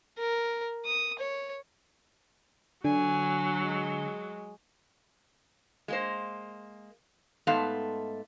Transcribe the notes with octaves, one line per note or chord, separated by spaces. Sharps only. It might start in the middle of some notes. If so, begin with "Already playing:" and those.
A#4
D#6
C#5
D3 F#3 G#5
G#3
G#3 A#3 C5
G#2 A3 B3 F5 A5